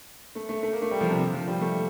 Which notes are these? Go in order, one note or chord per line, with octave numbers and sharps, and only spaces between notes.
A3
A3
A3
A#3
A3
G3
F3
C3
D3
F3
G3
A3